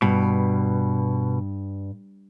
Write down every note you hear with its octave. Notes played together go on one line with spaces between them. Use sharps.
G2 B2